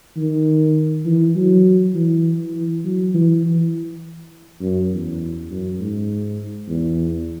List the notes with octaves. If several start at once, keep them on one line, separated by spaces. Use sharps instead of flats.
D#3
E3
F#3
E3
E3
F#3
E3
E3
F#2
E2
F#2
G#2
E2